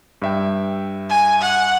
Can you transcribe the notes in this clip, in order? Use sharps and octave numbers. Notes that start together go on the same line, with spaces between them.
G2 E5 G5
G#5
F#5